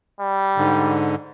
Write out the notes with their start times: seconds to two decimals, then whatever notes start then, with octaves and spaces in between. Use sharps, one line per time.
0.20 G3
0.57 G#2 D3